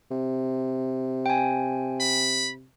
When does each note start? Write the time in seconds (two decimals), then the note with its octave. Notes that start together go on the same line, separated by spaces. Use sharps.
0.11 C3
1.26 G5 G#5
2.00 B5